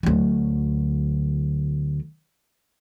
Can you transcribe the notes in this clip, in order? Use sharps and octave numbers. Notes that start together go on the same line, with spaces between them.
D2 F#3